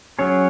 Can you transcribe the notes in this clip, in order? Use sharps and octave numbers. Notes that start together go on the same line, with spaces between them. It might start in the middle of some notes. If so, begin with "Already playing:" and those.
F#3 C#4 G#4 C#5